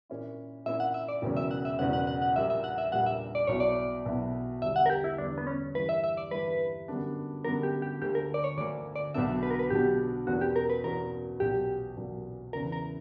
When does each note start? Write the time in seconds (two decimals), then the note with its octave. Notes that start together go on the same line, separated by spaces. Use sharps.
0.10 A#2 A#3 C#4 E4
0.66 A#2 A#3 C#4 E4 E5
0.80 F#5
0.94 E5
1.08 D5
1.22 E1 E2 C#3 F#3 C#4
1.37 E5
1.51 F#5
1.65 E5
1.79 E1 E2 C#3 F#3 C#4 F#5
1.93 F#5
2.07 F#5
2.22 F#5
2.36 A#1 A#2 G3 A#3 E5
2.50 E5
2.64 F#5
2.78 E5
2.92 A#1 A#2 G3 A#3 F#5
3.06 E5
3.35 D5
3.47 B1 B2 F#3 B3 E4 C#5
3.60 D5
4.06 B1 B2 F#3 B3 E4
4.62 E2 D3 G3 E5
4.76 F#5
4.86 A#4
4.90 G4
5.04 E4
5.18 E2 D3 G3 D4
5.38 B3
5.47 C#4
5.75 G2 E3 A#3 E4 B4
5.89 E5
6.04 E5
6.17 D5
6.31 G2 E3 A#3 E4 B4
6.88 F#2 D3 G3 B3 D4
7.44 F#2 D3 G3 B3 D4 A#4
7.63 G4
7.82 G4
8.01 D2 D3 A#3 G4
8.15 A#4
8.34 D5
8.44 C#5
8.57 D2 D3 A#3 D5
8.96 D5
9.14 B1 B2 F#3 B3 D4 E5
9.43 B4
9.51 A#4
9.59 B4
9.70 B1 B2 F#3 B3 D4 G4
10.27 E2 B2 A#3 C#4 F#4
10.41 G4
10.56 A#4
10.70 B4
10.84 E2 B2 A#3 C#4 A#4
11.40 B1 A#2 F#3 G4
11.97 B1 A#2 F#3
12.53 E2 C#3 E3 A#4
12.72 A#4